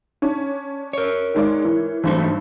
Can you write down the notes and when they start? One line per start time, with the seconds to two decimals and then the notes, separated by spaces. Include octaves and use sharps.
0.22 C#4 D4
0.93 A#4 C#5
1.34 D#3 G#3 D5
1.65 E3
2.04 G#1 G2 E3 F#3 A3 C5